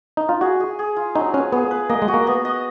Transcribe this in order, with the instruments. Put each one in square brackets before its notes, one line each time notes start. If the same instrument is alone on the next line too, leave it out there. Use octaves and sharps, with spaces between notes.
[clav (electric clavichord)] D#4
F4
[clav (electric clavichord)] F#4 [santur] G#4
[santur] G#4
G#4
F4
[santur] F#3 [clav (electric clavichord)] D#4
[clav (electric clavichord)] C#4 [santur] B4
[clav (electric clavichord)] B3 [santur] G#4
[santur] B4
[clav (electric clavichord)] A#3 [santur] D#5
[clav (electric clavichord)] G#3
[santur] F#4
[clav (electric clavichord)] A#3
[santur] B3
D#5